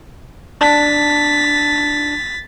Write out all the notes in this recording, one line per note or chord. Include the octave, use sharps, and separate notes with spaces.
D4 A5 A6 B6